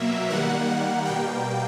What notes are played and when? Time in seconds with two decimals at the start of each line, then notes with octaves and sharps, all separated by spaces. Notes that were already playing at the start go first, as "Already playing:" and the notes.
Already playing: B2 F#3 A#3 E5
0.30 D#3 G3 A#3 F#5
1.05 B2 G3 A#3 G5